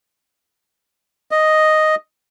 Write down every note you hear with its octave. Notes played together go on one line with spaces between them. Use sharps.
D#5